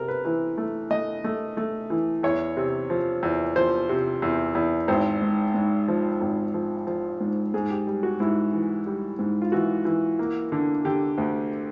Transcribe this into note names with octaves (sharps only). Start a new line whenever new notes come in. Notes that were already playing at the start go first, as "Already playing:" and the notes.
Already playing: C3 A4 A#4
B4
E3 B4
A3
A3 D#5
A3
A3
E3
E2 C#5
C3
F3
E2
F3 C5
C3
E2
E2
G#1 C5
G#2
G#2
F3
G#1
F3
F3
G#2
G#2 G#4
G4
G3
F#4
G#2 E4
E3
G3
G#2
F4
E3 F#4
E3
A#3
D3
D3 G4
D2